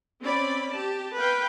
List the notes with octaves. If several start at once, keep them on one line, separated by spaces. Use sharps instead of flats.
C4 C#4 D5 B5
G4 A5
B4 F5 G5